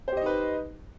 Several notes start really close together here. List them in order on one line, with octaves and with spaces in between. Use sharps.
C5 G4 D#5 D#4 B4